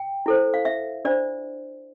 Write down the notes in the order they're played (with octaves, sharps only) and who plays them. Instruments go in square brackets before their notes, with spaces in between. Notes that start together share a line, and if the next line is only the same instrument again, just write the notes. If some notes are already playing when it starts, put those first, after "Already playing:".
Already playing: [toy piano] G5
E4 A4 C5
F5
E5
D4 F4 C5 D5